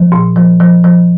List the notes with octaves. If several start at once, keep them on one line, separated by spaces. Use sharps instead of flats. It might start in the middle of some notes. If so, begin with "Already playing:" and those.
Already playing: F3
A#2
F3
F3
F3